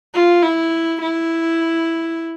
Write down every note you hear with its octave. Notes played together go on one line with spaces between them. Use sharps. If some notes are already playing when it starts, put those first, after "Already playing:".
F4
E4
E4